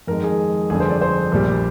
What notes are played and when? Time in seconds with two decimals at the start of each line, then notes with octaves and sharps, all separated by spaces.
0.07 F2 D#3 G#3 A#4
0.24 G#4
0.70 G1 F2 D3 G#4
0.80 C5
0.90 D5
1.01 C5
1.32 A#1 A#2 G3